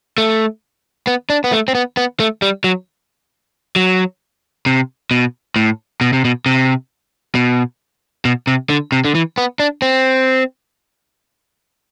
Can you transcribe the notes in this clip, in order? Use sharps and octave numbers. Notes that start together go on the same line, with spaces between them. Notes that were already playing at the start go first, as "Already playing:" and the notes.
A3
B3
D4
B3
A3
C4
B3
B3
A3
G3
F#3
F#3
C3
B2
A2
B2
C3
B2
C3
B2
B2
C3
D3
C3
D3
E3
B3
D4
C4